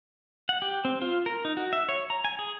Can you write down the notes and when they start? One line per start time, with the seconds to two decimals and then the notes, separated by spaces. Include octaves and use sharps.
0.49 F#5
0.62 G4
0.85 C4
1.02 F4
1.26 A#4
1.45 D#4
1.57 F#4
1.73 E5
1.89 C#5
2.10 A#5
2.25 G#5
2.39 G#4